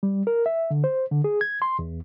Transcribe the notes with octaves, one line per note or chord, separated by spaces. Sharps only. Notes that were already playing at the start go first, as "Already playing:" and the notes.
G3
A#4
E5
D3
C5
D3
G#4
G#6
C6
E2